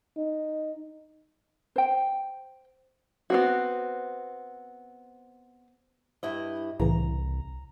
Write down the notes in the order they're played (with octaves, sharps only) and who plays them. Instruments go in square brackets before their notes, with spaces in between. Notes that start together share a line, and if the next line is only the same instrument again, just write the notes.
[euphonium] D#4
[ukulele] C5 G5
[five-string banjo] B3 C4 F#4
[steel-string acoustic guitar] G2 E4 D#5
[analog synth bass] C2 [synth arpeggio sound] A2 C#3 E3 [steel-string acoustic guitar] A#5